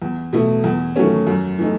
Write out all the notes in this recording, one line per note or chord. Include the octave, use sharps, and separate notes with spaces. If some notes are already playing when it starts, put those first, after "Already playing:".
E2
B2 A3 E4
E2
D#3 F#3 A3 C#4
F#2
E3 A3 D#4